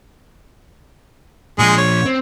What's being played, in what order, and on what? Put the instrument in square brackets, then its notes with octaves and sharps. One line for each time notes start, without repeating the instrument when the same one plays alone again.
[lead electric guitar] A#2 F3 [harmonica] G#3 G#4
[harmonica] C#5
[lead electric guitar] C4